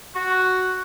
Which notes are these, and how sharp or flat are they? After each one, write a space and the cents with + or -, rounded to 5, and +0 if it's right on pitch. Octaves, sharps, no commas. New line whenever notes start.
F#4 +5